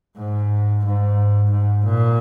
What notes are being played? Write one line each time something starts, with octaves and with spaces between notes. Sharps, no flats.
G#2
G#2
G#2
A#2